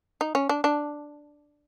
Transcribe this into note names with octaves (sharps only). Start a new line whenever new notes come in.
D#4
C#4
D4
D4